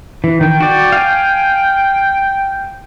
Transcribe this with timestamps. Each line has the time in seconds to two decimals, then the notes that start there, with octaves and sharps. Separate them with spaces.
0.24 E3
0.41 D#3 G5
0.60 F#4 D5
0.92 F5 G#5